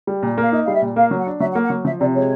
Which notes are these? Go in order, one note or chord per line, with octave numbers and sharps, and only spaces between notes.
G3
A#2
A#3 F5
D#4 E5
G3 F5
E5
A#2
A#3 F5
F#3
F#5
D4
F#3 E5
F#5
A#3
F#5
F#3
F3 E5
C3 D5
G#3 C#5